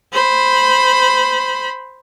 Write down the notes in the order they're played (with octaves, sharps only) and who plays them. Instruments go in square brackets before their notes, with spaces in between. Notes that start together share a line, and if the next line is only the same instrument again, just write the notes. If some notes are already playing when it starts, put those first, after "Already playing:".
[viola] C5 B5